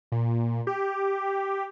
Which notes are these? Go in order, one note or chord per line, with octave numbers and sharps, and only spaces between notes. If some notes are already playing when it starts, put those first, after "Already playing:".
A#2
G4